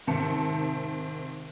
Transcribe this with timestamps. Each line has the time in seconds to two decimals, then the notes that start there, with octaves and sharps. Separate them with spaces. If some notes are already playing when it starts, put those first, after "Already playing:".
0.07 G#2 C3 D#3 E5 A5 C#7